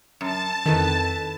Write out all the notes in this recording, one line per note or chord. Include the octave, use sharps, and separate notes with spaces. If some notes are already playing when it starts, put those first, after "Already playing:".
F#2 A5
F2 D#3 E4 A4 B4